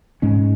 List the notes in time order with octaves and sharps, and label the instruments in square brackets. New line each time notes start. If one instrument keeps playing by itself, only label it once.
[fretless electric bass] G#2 G#3 C#4